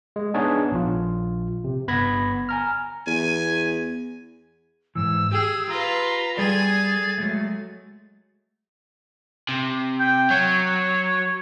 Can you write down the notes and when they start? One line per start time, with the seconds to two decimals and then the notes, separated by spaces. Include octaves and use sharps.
0.16 G#3
0.34 B3 D4 D#4 G#4 C#5 A5
0.72 A#1 F4
1.64 C3
1.88 G1 B3 B5 G#6 A#6
2.49 G#5 A#5 F6
3.07 E2 G#5
4.95 G#2 E3 E6
5.32 G4 G#4
5.69 F4 B4 A#5
6.37 G3 G#4 A4 D5 G#5 A6
7.18 F#3 G#3 A3
9.49 C3
10.00 G5
10.30 F#3 C#5